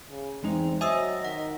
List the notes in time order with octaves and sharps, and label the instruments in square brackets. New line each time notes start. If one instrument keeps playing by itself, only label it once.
[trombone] C#3
[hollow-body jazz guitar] E2 G#3 D#4 [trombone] C4
[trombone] F#3 [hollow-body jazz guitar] C5 G#5 [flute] D#5 [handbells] E5 D#6 E6
[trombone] D#3 [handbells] F#5